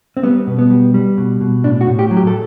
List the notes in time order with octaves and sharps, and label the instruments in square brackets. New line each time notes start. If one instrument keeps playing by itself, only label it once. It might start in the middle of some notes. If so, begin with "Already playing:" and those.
[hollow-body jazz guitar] C4
G3 B3
B2
B3
G3
G3
B2
B2
A2 D4
F#4
A2
G4
F#3
G4
A4